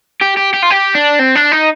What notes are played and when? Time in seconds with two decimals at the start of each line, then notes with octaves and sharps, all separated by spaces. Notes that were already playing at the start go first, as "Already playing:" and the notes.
0.21 G4
0.37 G4
0.54 G4
0.63 F4
0.70 G4
0.95 D4
1.19 C4
1.35 D4
1.52 D#4